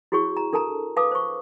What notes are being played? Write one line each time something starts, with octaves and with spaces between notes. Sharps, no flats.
E4 F#4 G#4 C#5 C#6
A#5
D4 A4 A#4 A5 A#5
B4 F5 A5 D6 D#6
C5 C#6